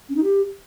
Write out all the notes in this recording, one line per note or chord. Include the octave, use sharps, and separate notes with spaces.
C#4
D#4
G4